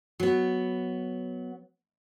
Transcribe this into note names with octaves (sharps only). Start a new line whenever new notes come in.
F#3 B3